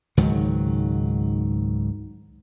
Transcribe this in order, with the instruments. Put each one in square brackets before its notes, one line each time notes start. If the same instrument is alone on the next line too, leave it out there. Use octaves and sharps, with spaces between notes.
[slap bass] C#2 G#2 D#3 F#3